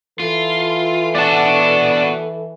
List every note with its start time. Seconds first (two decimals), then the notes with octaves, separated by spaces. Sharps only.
0.20 E3 F4 A4
1.15 B3 F#4 D5 A5